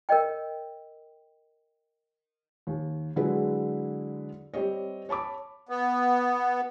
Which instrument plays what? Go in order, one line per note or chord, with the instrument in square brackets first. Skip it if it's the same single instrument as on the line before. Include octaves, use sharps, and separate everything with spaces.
[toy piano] A#4 C#5 D#5 G5
[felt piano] D#2
D3 F#3 G#3 E4 G#4 B4
G3 C4 G4 C#5 D#5
C#5 A5 B5 D6
[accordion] B3